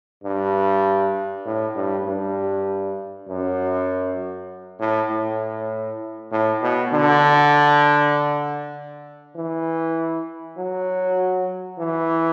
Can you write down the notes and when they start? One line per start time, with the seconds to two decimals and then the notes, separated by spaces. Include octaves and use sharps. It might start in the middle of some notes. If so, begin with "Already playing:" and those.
0.24 G2
1.46 A2
1.76 G2
2.06 G2
3.28 F#2
4.80 A2
5.10 A2
6.32 A2
6.62 B2
6.93 D3
9.36 E3
10.58 F#3
11.79 E3